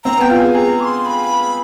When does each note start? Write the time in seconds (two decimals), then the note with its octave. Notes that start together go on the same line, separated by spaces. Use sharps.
0.04 C4 A#5
0.17 B3 G5
0.30 F4
0.38 G#4 G#5
0.54 G#4 A#5
0.80 D6
0.84 C6
1.05 B5